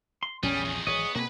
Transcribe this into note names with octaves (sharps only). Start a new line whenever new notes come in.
C6
A#1 E2 G3 C#4 G#4
F2 D#3
G#1 E3 F#3 B3 G#4 C#5 D#5
B2 A#3 C4 F#4 G#4 B4